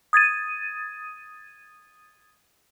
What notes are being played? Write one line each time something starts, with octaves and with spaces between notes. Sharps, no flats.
D#6 G#6 A6 D#7